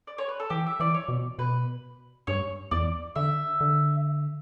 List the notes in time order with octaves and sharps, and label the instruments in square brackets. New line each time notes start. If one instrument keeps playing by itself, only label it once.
[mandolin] D5
C#5
B4
A4
[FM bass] E3 [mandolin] G4
[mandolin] E5
[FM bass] E3 [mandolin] D5
[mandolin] C#5
[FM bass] B2
[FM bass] B2 [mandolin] B4
[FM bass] G2 [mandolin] C#5
[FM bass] E2 [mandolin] D5
[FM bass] D3 [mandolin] E5
[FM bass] D3